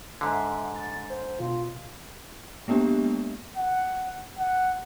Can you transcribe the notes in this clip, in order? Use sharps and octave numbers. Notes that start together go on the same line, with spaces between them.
G#2 D3 E5
A6
C5
B2 F4
G#3 A#3 B3 D4 G4
F#5
F#5